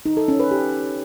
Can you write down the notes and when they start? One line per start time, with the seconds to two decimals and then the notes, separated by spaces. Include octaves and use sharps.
0.06 D#4
0.17 A4
0.28 C#4
0.40 B4
0.51 G4